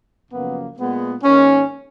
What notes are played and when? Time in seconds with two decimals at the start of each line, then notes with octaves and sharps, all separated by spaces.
0.30 F#2 C#3 F3 A#3 B3
0.78 A#2 G#3 B3
1.23 G#2 D#3 A#3 C#4